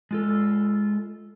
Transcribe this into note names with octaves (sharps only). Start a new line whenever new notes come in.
G#3 F4 A4